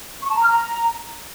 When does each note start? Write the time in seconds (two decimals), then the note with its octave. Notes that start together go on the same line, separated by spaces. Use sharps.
0.23 C#6
0.29 A5
0.36 A#5
0.42 F6
0.49 A#5